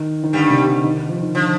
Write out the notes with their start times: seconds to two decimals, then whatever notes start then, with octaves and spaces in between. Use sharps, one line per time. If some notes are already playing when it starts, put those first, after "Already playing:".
Already playing: D#3
0.24 D#3
0.33 G2 D3 G3
0.50 C3
0.67 D3
0.84 D#3
0.96 D#3
1.09 F3
1.22 D#3
1.35 D3 F3